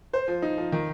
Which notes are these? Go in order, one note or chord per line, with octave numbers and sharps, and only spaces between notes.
C5
F3
D#4
F3
D#3